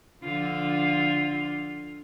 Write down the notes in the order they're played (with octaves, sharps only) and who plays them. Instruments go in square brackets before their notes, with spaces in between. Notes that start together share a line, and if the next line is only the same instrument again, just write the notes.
[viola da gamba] D3 F3 F4